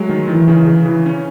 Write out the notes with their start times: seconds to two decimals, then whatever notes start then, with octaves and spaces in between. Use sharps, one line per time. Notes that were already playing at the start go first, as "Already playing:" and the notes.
Already playing: F#3 G#3 A3
0.09 D#3
0.28 D#3 E3
0.48 C#3
0.67 C#3
0.86 E3
1.06 C#4